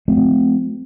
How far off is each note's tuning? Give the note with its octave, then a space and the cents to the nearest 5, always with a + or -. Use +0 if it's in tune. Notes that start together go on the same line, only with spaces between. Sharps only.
F3 +20 A3 -35 C4 -25